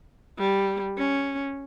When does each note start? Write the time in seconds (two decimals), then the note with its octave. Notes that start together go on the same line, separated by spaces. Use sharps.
0.38 G3
0.98 C#4